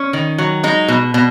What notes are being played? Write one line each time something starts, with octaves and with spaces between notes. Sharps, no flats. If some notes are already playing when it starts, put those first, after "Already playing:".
Already playing: C#4
D#3
F#3
G#3 D#4
B2
B2